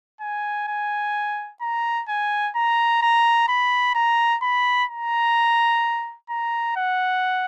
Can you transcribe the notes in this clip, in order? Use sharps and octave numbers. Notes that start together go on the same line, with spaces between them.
G#5
G#5
A#5
G#5
A#5
A#5
B5
A#5
B5
A#5
A#5
F#5